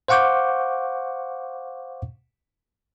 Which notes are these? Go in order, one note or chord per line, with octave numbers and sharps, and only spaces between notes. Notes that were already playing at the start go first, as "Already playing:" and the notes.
C5 F5 F#5 C#6 D6 G6